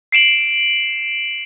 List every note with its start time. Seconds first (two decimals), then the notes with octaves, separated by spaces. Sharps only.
0.12 C7 D7 E7 F#7